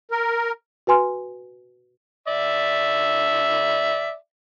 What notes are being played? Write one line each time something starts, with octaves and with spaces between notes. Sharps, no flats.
A#4
F#4 B4 G#5 C6 F6
D5 E5